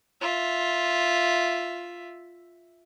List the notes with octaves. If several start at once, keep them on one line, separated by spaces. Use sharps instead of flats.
F4 E5